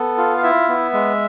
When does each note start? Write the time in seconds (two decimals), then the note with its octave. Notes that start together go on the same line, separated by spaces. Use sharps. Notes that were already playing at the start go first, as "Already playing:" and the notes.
Already playing: B3 A4
0.18 F4
0.38 F5
0.43 E4 E5
0.69 B3
0.93 G#3